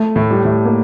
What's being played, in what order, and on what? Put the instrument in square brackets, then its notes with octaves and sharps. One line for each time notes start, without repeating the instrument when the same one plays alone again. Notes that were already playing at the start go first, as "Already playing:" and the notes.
Already playing: [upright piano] A3
[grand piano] A2
[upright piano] G3
[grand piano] A2
[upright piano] A#3